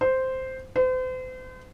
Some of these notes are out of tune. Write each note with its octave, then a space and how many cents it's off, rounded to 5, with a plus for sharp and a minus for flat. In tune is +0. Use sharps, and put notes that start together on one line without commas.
C5 -5
C5 -40